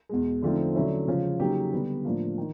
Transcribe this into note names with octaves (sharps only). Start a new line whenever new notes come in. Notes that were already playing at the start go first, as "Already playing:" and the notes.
E2 B2 G#3
D3 F3 A3 C4 D#4
D3 F#3 A3 C#4 E4
C#3 F3 G#3 C#4 F4
C#3 F#3 A#3 D#4 G4
D3 G3 B3
A2 F3 A#3 D4 F4
D#3